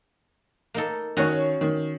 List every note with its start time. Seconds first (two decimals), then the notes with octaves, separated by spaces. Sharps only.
0.74 A#3 D#4 A4
1.17 D#3 C#4 F#4 C#5
1.61 D#3